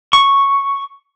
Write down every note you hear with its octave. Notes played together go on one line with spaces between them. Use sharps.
C#6